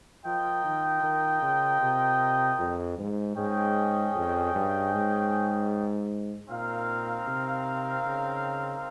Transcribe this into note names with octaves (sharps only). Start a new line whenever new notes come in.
F3 F4 A#4 D#5 G5
D#3
D#3
C#3
C3
F2
G#2
G#2 C#4 G#4 D#5 G5
F2
G2
G#2
A#2 C4 D#4 A#4 F5
C3
C#3